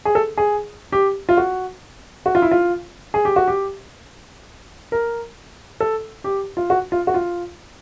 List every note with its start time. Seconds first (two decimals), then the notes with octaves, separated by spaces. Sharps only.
0.05 G#4
0.15 A4
0.38 G#4
0.92 G4
1.29 F4
1.37 F#4
2.26 F#4
2.35 F4
2.42 E4
2.51 F4
3.14 G#4
3.25 G4
3.36 F#4
3.48 G4
4.92 A#4
5.80 A4
6.24 G4
6.57 F4
6.70 F#4
6.92 F4
7.07 F#4
7.14 F4